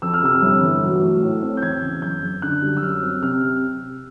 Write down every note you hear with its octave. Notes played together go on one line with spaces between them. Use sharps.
F2 E6
F6
C3 E6
G1
E3
F#3
A3
A2
C4
G6
E2 G#6
C#3
F#1 G6
F#1
D3 F#6
G3
E6
F#2 F6
C4
C3 F6